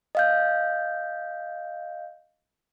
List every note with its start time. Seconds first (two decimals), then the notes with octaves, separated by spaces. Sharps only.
0.15 D#5 F5 G6